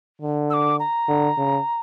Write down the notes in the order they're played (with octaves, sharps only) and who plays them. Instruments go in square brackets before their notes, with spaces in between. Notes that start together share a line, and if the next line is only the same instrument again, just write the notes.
[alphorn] D3
[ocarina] E6
D6
A#5
[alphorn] D3
C#3